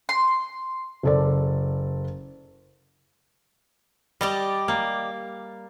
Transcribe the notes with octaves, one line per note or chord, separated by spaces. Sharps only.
C6
F#1 A4 D5
G3 G4 D5 D#5
A#3